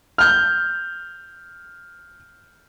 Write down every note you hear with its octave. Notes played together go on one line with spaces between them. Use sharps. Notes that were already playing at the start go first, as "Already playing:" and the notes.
F6 G6